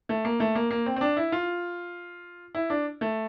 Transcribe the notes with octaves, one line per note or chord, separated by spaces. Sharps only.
A3
A#3
A3
A#3
A#3
C4
C4
D4
E4
F4
E4
D4
A3